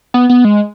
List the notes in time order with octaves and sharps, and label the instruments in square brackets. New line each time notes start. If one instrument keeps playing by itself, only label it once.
[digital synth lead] B3
B3
G#3